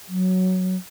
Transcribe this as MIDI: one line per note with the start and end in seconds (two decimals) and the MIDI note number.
0.09 0.76 54